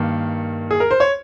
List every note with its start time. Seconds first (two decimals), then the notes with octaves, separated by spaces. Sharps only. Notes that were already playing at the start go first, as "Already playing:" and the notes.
Already playing: G2 D#3 A#3
0.71 G#4
0.80 A#4
0.91 C5
1.00 C#5